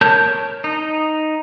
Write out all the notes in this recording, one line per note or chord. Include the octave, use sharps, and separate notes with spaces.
A#4 C#5 A5 G6
D#4